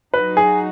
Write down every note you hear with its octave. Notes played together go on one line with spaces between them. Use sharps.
F#3 D#4 F#4 B4
G#4